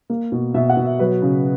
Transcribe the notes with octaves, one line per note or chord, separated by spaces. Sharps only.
A#3
B2
B2 E5
F#5
B2
E5
F#3 B4
C#3